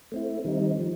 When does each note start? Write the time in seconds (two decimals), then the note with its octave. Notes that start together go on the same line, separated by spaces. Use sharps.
0.12 A3 C4 E4
0.45 D#3 G3 C4 D#4
0.79 F3